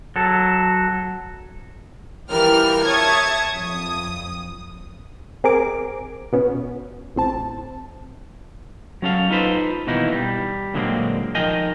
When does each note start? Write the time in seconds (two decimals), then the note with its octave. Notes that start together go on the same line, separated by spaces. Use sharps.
0.16 F#3 A4
2.30 E3 F3 G3 A#4 G5 F6
2.85 C#5 E5 A5 C#6 D#6 G#6
3.52 F2 D#6
5.44 C4 G#4 A#4 D6
6.33 B2 B3 C#4
7.16 A1 C4 A5
9.02 F#3 C#4 A4 F5
9.30 D#4 F4 A4 B4 C5
9.87 B2 D#3 E3 A#3 D#4 E4
10.12 G3
10.74 A#2 D3 F#3 G#3 A#3 C4
11.35 F3 D#4 A#4 D#5 G5 G#5